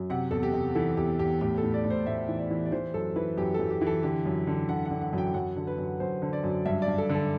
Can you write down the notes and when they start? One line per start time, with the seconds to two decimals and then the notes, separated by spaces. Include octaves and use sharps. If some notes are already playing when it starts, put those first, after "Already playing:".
Already playing: F#2
0.10 C3 F#5
0.31 E2 A4
0.43 G4
0.53 C3
0.75 E3 A4
0.97 E2 G4
1.19 E2 G4
1.41 A2 G4
1.58 A4
1.63 A2
1.74 D5
1.84 A2
1.90 C5
2.06 A2 E5
2.29 E3
2.39 D5
2.51 E3
2.66 D5
2.72 E3 C5
2.94 F#2 A4
3.16 E3 B4
3.37 F#2 G4
3.54 F#2 A4
3.70 G4
3.81 E3
3.87 A4
4.03 D3 G4
4.25 F#2
4.47 D3
4.69 D3 F#5
4.85 F#5
4.90 D3
5.01 F#5
5.13 F#2 G5
5.34 F#2 F#5
5.56 D3
5.67 B4
5.78 F#2
6.00 F#2 C5
6.22 D3
6.33 D5
6.44 F#2
6.66 G2 E5
6.82 D5
6.88 G2
6.98 A4
7.10 D3
7.15 A4